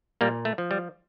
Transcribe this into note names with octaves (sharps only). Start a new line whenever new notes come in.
A#2 G3 A#3
A3
F3
G3